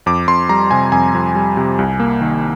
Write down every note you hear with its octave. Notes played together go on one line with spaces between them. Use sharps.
F2 D6
F2 C6
G3 A#5
C3 G#5
F2 G#5
F2
G3
C3
C2
A#3
D#3